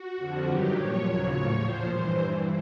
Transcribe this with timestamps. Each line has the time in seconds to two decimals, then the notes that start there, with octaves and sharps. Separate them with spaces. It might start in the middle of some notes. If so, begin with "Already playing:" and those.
Already playing: F#4
0.17 F2 D3 F3
0.47 G2 D#3 F#3 G4
0.75 A#2 F3 C#5
1.04 D#2 C#3 F#3
1.32 A2 F3 C#5
1.61 A#2 F3 C5
1.91 G2 E3
2.19 G2 E3